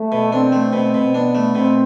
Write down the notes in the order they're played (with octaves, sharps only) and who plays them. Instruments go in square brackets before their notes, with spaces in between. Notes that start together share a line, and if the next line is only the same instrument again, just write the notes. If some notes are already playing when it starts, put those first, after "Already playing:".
Already playing: [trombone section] A3
[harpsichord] B2
[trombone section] C4 [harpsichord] D4
[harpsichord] A3
[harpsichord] B2 [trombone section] C4
[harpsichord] B2
[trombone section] B3 [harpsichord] D4
[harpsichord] A3
[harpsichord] B2 [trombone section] C4